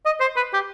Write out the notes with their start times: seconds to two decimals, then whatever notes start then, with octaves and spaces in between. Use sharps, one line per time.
0.06 D#5
0.21 C5
0.36 B4
0.54 G4